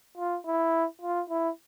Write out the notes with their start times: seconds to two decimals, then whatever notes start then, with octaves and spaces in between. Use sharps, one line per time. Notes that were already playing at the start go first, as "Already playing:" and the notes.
0.17 F4
0.46 E4
1.02 F4
1.30 E4